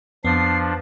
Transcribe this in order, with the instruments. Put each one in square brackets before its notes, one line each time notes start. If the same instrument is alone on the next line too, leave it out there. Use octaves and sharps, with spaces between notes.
[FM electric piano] F2 B3 [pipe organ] F3 D4 [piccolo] C7